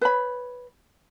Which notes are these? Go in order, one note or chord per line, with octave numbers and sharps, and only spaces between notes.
B4 C#5 B5